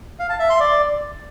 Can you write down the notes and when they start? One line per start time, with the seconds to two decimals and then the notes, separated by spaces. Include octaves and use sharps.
0.19 F5
0.29 A5
0.40 E5
0.50 C6
0.60 D5